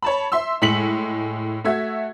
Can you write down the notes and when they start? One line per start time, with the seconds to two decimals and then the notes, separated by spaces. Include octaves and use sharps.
0.02 C#5 A5 B5
0.32 E5 C6 E6
0.62 A2 G#3 B6 C#7 F#7
1.64 A3 F#4 E5 G#6